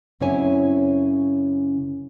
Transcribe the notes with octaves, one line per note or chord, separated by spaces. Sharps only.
F#2 C#3 C4 E4 C#5 G#5